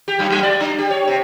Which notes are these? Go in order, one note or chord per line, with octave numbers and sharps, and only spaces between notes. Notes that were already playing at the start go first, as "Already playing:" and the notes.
G4
F#2
F#3
D5
D4
G4
C#5
C3